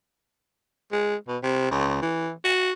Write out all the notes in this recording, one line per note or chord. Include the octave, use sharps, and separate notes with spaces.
G#3
B2
C3
C#2
E3
F#4